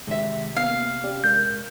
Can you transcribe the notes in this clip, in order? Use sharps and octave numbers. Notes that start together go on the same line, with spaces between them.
C3 D#3 G#3 E5
A#3 B3 F5
C#4 G4 D5
G#3 A#4 G6